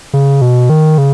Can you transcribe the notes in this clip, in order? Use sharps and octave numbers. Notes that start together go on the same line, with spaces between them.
C#3
B2
D#3
C#3